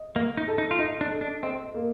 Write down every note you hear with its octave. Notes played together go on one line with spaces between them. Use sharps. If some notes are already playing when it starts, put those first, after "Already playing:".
Already playing: D#5
A#3 D#5
D#4
A4
D#4
F4
D#4 D#5
D4
A4
D4
C4 D#5
A#3